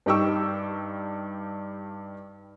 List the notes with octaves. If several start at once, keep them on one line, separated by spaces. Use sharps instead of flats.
G2 D#4 G4 C#6 E6